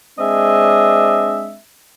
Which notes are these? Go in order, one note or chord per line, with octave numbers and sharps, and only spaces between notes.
G#3 C4 D4 D#5 E5